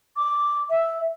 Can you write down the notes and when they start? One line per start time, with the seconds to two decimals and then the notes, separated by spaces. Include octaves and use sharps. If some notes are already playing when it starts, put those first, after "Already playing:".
0.16 D6
0.69 E5